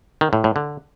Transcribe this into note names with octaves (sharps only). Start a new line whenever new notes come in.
D#3
A2
A2
D3